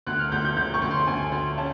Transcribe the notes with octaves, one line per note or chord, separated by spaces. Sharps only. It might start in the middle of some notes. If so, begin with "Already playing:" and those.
D2 F#6
F6
D2 G6
G6
D2 G6
C#6
D2
C6
D2 G#5
D2
C#3 A5